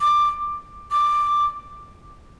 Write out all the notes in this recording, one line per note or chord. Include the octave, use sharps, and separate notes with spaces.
D6
D6